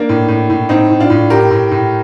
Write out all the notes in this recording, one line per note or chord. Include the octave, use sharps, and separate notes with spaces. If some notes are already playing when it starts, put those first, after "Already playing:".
Already playing: A#3 D4
A2
A2
A2
A2 C4 D#4
A2
D4 F4
A2
A2 G4 A#4
A2
A2